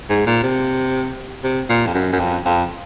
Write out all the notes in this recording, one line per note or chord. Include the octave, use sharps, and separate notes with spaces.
G#2
A#2
C3
C3
A#2
F2
F#2
F#2
F2
F2